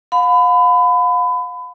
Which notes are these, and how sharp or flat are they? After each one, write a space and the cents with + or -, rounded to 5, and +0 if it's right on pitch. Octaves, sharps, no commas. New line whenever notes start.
F5 +40 B5 +30